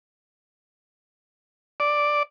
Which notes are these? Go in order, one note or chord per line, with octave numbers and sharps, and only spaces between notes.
D5